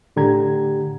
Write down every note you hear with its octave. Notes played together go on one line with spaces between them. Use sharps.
A2 D3 G4 A#5 G#6